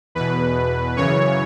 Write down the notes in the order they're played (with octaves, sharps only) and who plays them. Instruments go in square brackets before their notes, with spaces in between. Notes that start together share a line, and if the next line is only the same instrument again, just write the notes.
[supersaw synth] E2 B2 B4
F#2 C#3 E3 C#5